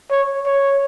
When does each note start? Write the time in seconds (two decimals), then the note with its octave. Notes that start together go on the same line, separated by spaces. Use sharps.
0.11 C#5
0.46 C#5